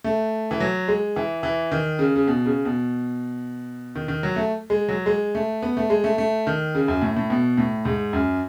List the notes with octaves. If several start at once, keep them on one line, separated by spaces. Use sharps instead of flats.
A3
E3
F#3
G#3
E3
E3
D#3
C#3
C#3
B2
C#3
B2
D#3
D#3
F#3
A3
G#3
F#3
G#3
A3
B3
A3
G#3
A3
A3
D#3
C#3
F#2
A2
A2
B2
A2
G#2
F#2